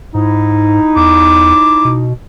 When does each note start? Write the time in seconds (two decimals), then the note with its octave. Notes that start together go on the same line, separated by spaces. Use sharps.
0.15 G#2 D#4 E4
0.96 E2 D6
1.85 B2